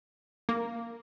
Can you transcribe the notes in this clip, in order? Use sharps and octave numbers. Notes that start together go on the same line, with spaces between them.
A#3